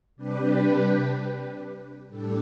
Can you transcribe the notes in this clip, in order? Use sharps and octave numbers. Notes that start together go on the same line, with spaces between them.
C3 G3 D4 G4 B4
A2 G3 D4 A4